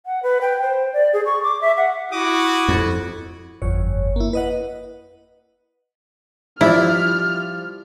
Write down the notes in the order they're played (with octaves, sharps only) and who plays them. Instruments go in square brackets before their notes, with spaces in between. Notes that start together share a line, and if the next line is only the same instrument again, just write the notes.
[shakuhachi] F#5
B4
G5
C5
D5
G#4
C#6
D6
E5
F#5
[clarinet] E4 [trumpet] F#4 [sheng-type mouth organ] D6 D#6
[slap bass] F2
[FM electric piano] G1 F2 C#5
A#3 E4
B4 D#5 F#5
[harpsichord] F3 G3 [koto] E4 [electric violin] F6